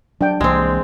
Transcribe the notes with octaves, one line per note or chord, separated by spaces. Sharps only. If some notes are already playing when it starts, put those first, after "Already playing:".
F#3 D4 G5
C2 E3 G#3 A#3 C4